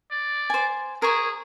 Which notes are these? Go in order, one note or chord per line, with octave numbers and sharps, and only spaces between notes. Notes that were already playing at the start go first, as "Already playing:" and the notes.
D5
C5 G#5
G#4 A#4 C5 C#5